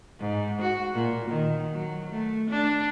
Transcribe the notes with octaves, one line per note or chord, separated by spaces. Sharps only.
G#2
F#4
A#2
D#3
F#3
A3
D4